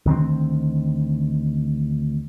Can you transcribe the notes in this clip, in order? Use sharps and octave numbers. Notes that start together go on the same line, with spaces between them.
D2 D#3 A#3 C4